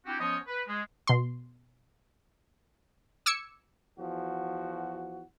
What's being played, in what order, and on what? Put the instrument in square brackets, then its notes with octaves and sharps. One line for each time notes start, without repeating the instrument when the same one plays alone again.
[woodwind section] C4 D4 E4 F#4 G4
F3 B3 C#4 C5 C#5 D#5
B4
G#3
[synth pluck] B2 C6
D6 E6 G#6 C#7
[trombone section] E2 F3 F#4